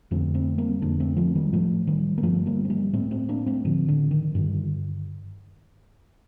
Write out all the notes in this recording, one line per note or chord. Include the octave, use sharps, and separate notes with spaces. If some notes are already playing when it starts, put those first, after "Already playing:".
F2 D3 A3 C4
A3 C4
G3 A#3
F2 D3 A#3 D4
A3 C4
F3 A3
D#3 G3
A2 F3 A3
D#3 G3
A#3
G2 D3 F3 A3
G3 A#3
C4
G3 A#3
A2 A3 C4
A3 C4
A#3 D4
A3 C4
A2 D3 F3
D3
D#3
G2 D3 D#3